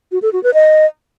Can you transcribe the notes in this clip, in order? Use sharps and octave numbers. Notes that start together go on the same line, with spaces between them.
F#4
A4
F#4
B4
D#5